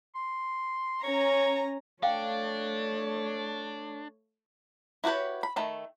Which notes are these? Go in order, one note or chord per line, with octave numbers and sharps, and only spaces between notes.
C6
C#4 C#5 A#5
A3 D4 C#5 F5 G5
E4 F#4 G4 B4 C#5
B5
D#3 A3 B5